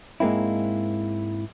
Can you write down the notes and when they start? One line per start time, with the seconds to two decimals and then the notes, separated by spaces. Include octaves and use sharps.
0.20 G#2 G#3 A#3 C4 E4